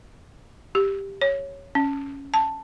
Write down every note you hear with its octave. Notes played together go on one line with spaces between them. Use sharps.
G4
C#5
C#4
A5